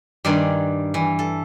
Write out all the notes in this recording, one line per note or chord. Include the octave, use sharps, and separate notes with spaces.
G2 D#3 G3 D5 G#5 C6
E3
A4